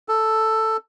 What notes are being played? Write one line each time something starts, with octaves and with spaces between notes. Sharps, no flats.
A4